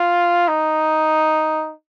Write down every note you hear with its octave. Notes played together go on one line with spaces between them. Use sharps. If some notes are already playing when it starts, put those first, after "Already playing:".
Already playing: F4
D#4